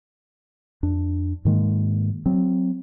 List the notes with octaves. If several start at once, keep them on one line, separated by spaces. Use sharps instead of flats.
F2 D4
G#2 D#3 G#3 A#3
F#3 C4